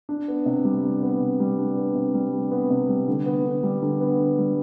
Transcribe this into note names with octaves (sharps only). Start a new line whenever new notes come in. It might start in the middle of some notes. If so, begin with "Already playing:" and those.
D4
B3
C3
G3
D4
B3
C3
G3
D4
B3
C3
G3
D4
B3
C3
G3
D3
B3
D3
G3
D3
B3
D3
G3